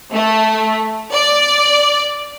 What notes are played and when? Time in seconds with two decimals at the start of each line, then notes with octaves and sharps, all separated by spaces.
0.12 A3
1.14 D5